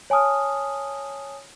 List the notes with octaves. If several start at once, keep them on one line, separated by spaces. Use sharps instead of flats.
C#5 G#5 A5 D#6 F6